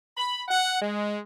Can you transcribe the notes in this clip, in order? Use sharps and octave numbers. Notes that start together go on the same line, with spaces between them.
B5
F#5
G#3